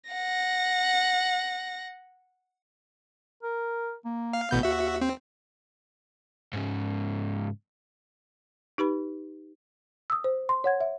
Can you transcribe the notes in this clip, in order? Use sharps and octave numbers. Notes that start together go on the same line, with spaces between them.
F#5 A#6
A#4
A#3
F5
A1 B2 B3 G6
D#2 F#4 E5
C4
G#2 C#3
D#4 G4 B4 B5
D#6 E6
C5
C6
C#5 F#5 G#6
E5